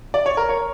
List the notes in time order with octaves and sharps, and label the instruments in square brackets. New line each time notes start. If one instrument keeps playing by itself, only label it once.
[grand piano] D5
C#5
A#4
C#5